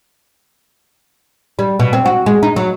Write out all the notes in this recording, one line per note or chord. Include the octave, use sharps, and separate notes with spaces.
G3
B2
C4
F#4
G#3
D#4
F#3